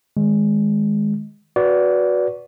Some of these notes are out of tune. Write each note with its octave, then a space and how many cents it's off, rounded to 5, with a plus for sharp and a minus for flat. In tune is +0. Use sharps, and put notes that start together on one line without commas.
D#3 +0 G#3 +0
F#4 +0 B4 +0 D5 -20